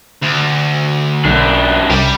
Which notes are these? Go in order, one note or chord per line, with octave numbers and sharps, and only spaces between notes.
D2
B1 F#2 D4
C2 G3 G4